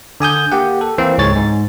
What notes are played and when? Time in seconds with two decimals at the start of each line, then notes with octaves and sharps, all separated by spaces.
0.20 D3 G#5 D#6 G6
0.52 A#3 G4 F#5
0.81 A4
0.98 E3 A#3 C4
1.18 C#2 G#2 G#3 C#5 A6
1.36 G#2